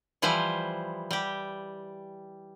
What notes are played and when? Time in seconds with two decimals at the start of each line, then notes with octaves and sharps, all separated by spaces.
0.22 E3 F3 G3 E4 C5
1.11 G3 G4